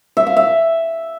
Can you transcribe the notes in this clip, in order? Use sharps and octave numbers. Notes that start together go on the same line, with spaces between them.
E5
F5
E5